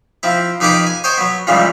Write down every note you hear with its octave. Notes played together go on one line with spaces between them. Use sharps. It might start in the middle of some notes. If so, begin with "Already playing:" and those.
F3 C4 E4
F2 D#4 G4 G#4 B4 D6
G#5
C5 C#5 D#5 G5 G#5 C6
F#3 B3
C#2 A#2 E3 F3 G3 G#3